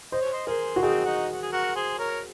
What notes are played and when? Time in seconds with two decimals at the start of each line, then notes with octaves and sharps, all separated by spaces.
0.12 C5 D#5
0.22 C#5
0.32 C5 D#5
0.47 G#4 A#4 C5
0.76 F#4
0.82 C4 D#4 G#4
1.05 D#4 F#4
1.32 F#4
1.42 G#4
1.52 F#4 A#4
1.75 G#4 C5
1.98 A#4 C#5